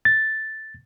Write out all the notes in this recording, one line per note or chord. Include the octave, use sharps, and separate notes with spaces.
A6